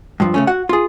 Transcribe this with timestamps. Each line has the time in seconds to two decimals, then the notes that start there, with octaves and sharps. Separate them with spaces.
0.20 G2 F3
0.34 C#3 A3 C#4
0.47 F#4 F#5
0.69 F4 G#4